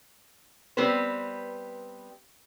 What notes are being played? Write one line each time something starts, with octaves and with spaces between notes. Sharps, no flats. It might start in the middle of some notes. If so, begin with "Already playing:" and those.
G3 B3 C4 B4 C5